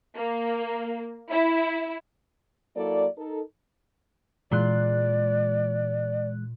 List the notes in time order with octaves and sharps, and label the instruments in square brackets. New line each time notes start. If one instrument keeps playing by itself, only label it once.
[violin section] A#3
E4
[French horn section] F#3 A#3 E4 A4 D5
D#4 A4 A#4
[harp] A#2 C6 [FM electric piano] E3 G#3 F#6 [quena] D5